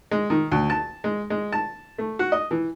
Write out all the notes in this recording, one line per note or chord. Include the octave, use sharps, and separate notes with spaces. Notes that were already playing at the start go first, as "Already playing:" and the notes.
G#3
D#3
D2
A5
G#3
G#3
A5
A3
F#4
D#5
E3